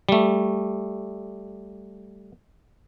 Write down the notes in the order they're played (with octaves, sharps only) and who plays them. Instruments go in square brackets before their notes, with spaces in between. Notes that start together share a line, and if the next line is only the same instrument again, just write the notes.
[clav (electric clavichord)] G3 A3